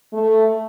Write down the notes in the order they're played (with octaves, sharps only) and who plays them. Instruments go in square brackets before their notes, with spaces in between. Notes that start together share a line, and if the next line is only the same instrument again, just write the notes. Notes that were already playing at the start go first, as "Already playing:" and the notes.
[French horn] A3